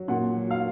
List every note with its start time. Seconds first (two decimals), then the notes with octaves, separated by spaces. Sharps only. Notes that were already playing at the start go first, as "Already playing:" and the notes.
Already playing: F#3
0.08 A#2 F#5
0.36 F#3
0.51 F5